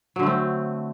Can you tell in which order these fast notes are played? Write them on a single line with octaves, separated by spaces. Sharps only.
F#3 D3 A3 C4